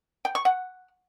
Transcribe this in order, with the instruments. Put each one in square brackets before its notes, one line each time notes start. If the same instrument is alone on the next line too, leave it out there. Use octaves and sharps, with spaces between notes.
[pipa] G5
C#6
F#5